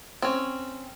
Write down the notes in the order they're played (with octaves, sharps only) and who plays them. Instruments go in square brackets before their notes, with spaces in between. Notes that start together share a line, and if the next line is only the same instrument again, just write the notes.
[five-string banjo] C4 C#4